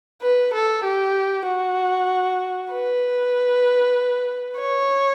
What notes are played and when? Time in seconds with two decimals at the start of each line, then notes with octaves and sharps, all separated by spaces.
0.22 B4
0.53 A4
0.84 G4
1.47 F#4
2.73 B4
4.60 C#5